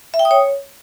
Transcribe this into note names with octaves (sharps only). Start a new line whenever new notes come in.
E5
G5
D#6
C#5